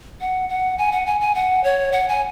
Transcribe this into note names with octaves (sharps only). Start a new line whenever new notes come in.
F#5
F#5
G#5
F#5
G#5
G#5
F#5
C#5
F#5
G#5